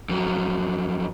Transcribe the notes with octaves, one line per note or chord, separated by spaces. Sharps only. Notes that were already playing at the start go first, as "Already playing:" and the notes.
F2 F#3